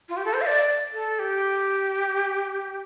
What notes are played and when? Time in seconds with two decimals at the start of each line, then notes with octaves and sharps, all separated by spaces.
0.09 F4
0.17 G4
0.25 A4
0.34 C5
0.41 F5
0.46 D5
0.93 A4
1.19 G4